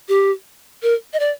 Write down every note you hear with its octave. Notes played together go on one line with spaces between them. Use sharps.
G4
A#4
D#5
D5